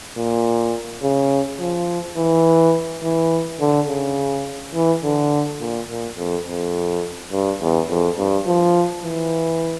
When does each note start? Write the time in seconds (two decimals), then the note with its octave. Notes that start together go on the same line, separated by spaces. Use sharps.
0.17 A#2
1.03 C#3
1.60 F3
2.17 E3
3.03 E3
3.60 D3
3.89 C#3
4.75 E3
5.04 D3
5.61 A#2
5.89 A#2
6.18 F2
6.46 F2
7.32 G2
7.61 E2
7.89 F2
8.18 G2
8.47 F3
9.04 E3